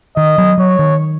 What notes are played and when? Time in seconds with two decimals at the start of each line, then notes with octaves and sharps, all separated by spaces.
0.16 D#3 D#5
0.38 F#3
0.58 F#3 C#5
0.79 D#3